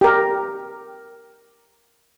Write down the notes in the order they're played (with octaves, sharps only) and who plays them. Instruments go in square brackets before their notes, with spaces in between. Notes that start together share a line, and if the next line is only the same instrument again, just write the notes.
[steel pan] G4 A#4